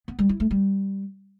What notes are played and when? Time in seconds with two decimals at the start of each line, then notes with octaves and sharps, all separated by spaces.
0.08 B3
0.19 G3
0.29 E4
0.40 A3
0.51 G3